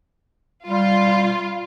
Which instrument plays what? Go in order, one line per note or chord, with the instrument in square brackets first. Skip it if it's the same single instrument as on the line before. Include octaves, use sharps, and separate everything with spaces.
[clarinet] G3 [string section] F4